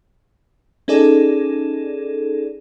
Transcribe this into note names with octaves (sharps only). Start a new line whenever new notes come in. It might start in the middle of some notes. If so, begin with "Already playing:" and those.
C#4 D#4 G#4 A4 D5